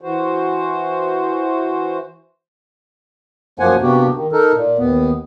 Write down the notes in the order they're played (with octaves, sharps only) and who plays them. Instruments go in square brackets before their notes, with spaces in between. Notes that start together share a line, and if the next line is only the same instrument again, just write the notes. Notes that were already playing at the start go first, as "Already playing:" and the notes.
[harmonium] E3 F#4 C5
F#2 F3 A#3 C5 F#5 G#5
C3 A#3 B3 D4 F#4 G4
D#3
D#4 A4 A#4
A#2
D#2 B3